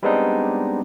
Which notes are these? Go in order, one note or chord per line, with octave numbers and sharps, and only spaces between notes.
G3 G#3 B3 C4 D4 D#4